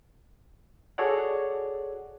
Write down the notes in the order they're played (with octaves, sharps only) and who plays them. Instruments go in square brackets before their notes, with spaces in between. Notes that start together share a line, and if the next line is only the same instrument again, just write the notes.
[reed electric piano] F#4 G#4 A4 C#5 D5 F#5